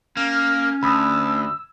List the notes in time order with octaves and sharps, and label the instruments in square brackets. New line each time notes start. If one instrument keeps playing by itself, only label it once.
[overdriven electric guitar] A#3 [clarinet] C#4 [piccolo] F6
[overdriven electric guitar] D2 [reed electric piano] B5 D#6 [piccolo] E6